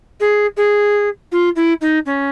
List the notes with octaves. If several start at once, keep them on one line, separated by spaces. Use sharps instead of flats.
G#4
G#4
F4
E4
D#4
C#4